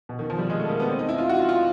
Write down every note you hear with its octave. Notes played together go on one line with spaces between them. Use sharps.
B2
D#3
F3
G3
G#3
A3
A#3
B3
C4
D#4
E4
F4
F#4
F4
F4